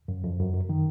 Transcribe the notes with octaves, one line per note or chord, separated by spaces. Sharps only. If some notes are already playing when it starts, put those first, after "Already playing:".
F#2
F2
F#2
F#2
D#3